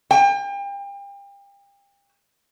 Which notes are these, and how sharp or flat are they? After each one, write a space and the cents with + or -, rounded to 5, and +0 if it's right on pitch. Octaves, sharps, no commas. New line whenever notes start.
G5 +35